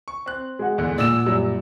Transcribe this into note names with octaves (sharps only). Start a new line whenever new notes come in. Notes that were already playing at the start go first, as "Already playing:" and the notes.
C#6
C4 F#6
G#3 F#4
E2 G#2 D3
A#2 D5 E6 E7
F#2 G3